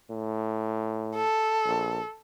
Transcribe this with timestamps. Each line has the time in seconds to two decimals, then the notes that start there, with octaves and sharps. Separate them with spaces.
0.10 A2
1.16 A4
1.65 A#1